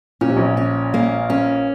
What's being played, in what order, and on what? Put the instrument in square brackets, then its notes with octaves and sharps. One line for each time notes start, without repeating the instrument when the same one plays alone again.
[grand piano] A#2 [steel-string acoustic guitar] C#4
[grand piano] C3
A#1 A#2
[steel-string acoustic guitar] C#4
A#3
C#4